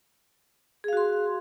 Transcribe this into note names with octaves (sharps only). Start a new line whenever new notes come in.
F#4 G#4 F5 C6